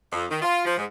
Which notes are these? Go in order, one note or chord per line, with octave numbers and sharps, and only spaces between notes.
F2
D#3
F4
F3
G#2